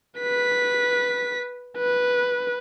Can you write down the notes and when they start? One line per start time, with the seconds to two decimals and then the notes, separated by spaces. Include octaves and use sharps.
0.20 B4 B6
1.77 B4